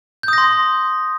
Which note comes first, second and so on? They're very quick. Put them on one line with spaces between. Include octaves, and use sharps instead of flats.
G6 D#6 A#6 C6